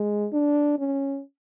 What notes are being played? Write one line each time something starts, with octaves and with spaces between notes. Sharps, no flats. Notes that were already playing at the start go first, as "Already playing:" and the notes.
Already playing: G#3
D4
C#4